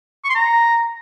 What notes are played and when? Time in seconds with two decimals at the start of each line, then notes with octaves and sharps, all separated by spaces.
0.24 C#6
0.30 C6
0.35 A#5